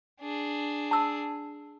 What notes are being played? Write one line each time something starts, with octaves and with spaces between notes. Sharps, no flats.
D4 G#4
A5 E6